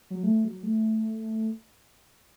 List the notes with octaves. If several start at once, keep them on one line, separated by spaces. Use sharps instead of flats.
F#3
A3
F#3
A3